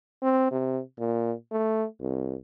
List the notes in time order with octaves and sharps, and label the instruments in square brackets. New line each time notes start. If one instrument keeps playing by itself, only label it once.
[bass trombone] C4
C3
A#2
A3
C2